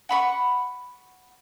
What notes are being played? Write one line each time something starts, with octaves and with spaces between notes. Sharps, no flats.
F#5 B5 C#6